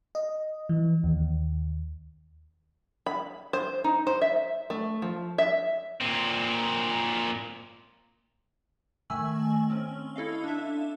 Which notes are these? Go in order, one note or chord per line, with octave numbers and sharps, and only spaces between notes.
D#5
E3
D#2
B5
C5
D#4
C5
E5
A3
F3
E5
A#2 C4
D#3 A3 G#5 E6 F#7
C4 C#4
E4 A4 D#5 F5
D4 E5